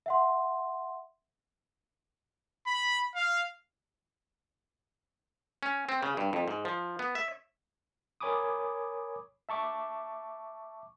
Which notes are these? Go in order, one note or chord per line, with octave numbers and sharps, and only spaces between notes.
E5 F#5 C6
B5
F5
C#4
C4
C#3
G2
F2
G#2
F3
B3
E5
A#4 C#5 G#5 B5 D6 D#6
E5 A5 C#6 D6